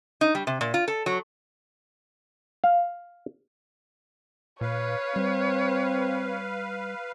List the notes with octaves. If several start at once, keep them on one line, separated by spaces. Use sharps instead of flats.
D#4
G3
C3
A#2
F4
A4
F#3
F5
A#2 B4 C#5 F5
G3 C4